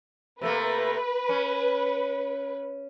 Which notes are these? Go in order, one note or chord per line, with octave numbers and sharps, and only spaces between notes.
C3 A3 A#3 B4
C#4